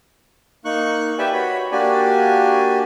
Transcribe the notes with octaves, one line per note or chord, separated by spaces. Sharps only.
A#3 D#4 C#6 F#6
G4 B4 D5 E5 G5 G#5
F#4 C#5 B5
A#3 D4 F#4 G4 D5 G#5